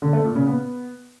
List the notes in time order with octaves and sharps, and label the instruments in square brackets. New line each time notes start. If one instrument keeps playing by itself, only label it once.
[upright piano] D3
A3
A#2
C#3
B3